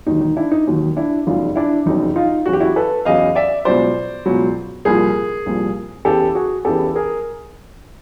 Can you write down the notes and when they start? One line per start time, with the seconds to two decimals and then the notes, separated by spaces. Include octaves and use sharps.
0.06 E1 D#2 D#3 F#3 D#4
0.21 D#4
0.37 D4 E4
0.52 D#4
0.66 E1 D#2 D#3 F#3
0.96 D4 E4
1.27 F1 E2 C#3 F#3 D#4 F4
1.56 D4 E4
1.86 F1 E2 C#3 F#3 D#4
2.16 D#4 F4
2.46 E2 C#3 F#3 F#4
2.53 G4
2.60 E4 F#4
2.76 A4 B4
3.05 E2 C#3 F#3 D#5 F5
3.36 D5 E5
3.65 C#2 B2 F#3 C5 D5
4.26 C#2 B2 F#3
4.85 C2 A#2 F3 G#4 A#4
5.46 C2 A#2 F3
6.05 E2 C#3 E3 G4 A4
6.35 F#4 G#4
6.65 E2 C#3 E3 G4 A4
6.95 G#4 A#4